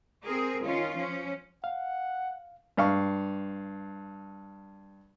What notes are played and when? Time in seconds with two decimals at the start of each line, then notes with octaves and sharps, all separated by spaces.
0.24 C4 G#4 A#4
0.63 D#3 C#4 F4
0.95 F3 C#4
1.64 F5 F#5
2.77 G2 F5 C#6